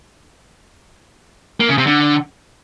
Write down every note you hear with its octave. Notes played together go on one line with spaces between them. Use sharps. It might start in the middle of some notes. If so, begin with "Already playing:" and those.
A#3
C#3
C3
D3